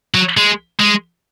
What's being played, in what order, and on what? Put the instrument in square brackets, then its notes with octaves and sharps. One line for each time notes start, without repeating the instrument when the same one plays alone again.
[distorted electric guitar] F#3
G#3
G#3